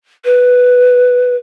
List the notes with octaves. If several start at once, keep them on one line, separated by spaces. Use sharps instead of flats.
B4